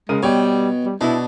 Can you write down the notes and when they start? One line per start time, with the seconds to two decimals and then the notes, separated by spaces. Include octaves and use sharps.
0.09 C#3 G#3 A#4 D#7
0.23 B2 G3 C#5 G5
0.85 G3
1.01 B2 B3 D4 E4